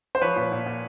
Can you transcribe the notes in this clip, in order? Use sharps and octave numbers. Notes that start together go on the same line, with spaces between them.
C5
F3 B4 C#5
A#2
A#2
A#2